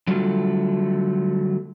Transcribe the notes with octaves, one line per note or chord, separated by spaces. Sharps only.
D3 F#3 G3 A3 F4